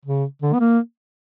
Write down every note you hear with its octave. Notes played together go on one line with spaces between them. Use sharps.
C#3
D3
B3
A#3